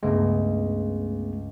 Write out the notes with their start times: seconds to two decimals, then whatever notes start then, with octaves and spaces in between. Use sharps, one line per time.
0.03 C#2 G2 G#3 A3 B3 D7